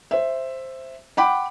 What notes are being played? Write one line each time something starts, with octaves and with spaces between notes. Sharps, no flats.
C5 E5
F#5 G5 B5 D6